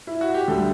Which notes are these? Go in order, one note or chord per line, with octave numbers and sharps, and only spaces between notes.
E4
F#4
G4
D2 D3 G3 A4